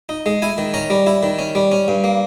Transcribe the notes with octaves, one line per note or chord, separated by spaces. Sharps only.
D#4
G#3
E4 G#5
D#3
C#4 A#5
G3
E4
D#3
C#4
G3
C#4
G2
A#3